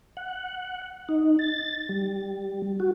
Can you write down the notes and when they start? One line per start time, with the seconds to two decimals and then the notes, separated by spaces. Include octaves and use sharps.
0.17 F#5
1.09 D#4
1.39 A6
1.89 G3
2.80 F#4